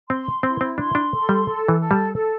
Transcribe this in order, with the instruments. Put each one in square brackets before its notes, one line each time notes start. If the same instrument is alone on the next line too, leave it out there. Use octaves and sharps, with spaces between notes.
[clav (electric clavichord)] C4 [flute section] C6
[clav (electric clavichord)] C4 [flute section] E4
[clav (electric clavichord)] C4
[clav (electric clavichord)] D4 [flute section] C6
[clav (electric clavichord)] D4
[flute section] A4
[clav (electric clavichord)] G3
[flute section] A4
[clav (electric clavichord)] E3
[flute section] A4
[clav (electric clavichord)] G3
[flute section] A4